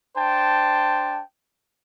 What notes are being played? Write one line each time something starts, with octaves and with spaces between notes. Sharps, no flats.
D4 C5 G5 A5